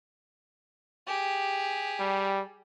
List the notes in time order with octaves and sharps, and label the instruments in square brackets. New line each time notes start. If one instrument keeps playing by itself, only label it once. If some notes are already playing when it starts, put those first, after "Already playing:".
[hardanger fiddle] G4 G#4
[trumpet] G3